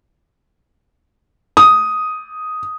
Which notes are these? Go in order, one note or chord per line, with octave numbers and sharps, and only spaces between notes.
D#6